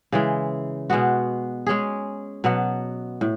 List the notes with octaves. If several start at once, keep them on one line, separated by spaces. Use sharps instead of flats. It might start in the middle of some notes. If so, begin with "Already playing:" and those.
C#3 E3 G#3
B2 G#3 B3 F#4
G#3 C#4 G#4
B2 F#3 B3
A2